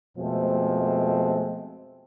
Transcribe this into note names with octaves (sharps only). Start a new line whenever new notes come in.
F2 B2 F3 G#3 A3 C4